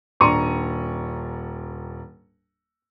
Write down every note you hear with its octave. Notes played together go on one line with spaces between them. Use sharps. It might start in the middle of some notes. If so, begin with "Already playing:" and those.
D#1 D4 A#5 C#6 C#7 D#7